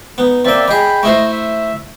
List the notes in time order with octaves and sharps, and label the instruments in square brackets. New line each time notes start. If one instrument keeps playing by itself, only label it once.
[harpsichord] B3 [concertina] D#4
[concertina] A#3 D5 E5 [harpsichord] C4 G5
[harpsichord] G#4 D#5 [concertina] G5 B5
[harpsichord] A3 E4 C5 [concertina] D#5
[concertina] E5